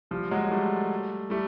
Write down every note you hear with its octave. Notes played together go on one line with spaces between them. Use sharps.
F3 G3
F#3 G#3
G3 A3
G3 A3